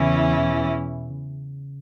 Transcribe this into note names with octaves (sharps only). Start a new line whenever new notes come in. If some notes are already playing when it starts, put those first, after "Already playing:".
Already playing: E2 C#3 E3 C#4 E4
B2
C#3